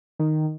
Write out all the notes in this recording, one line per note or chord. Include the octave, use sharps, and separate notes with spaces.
D#3